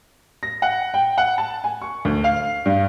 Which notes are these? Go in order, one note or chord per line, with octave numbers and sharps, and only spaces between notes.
A#6
F#5
G5
F#5
A5
G#5
C#6
D2
F5
G2